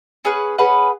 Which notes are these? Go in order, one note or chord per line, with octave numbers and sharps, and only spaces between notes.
C#4 G#4 B4 F#5
C#4 G#4 B4 F#5